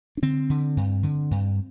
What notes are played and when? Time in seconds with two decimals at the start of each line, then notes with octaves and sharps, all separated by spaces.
0.17 D4
0.22 D3 C4
0.50 D3
0.77 G2
1.03 D3
1.31 G2